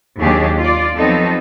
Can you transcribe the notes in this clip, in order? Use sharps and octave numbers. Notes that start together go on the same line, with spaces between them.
D#2 F#3 D4 G4 G#4
F4 D5
F3 F#3 B3 C4 D#4 A4